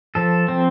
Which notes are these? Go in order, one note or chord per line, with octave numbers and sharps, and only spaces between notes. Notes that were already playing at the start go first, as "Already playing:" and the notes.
F3 A4
C4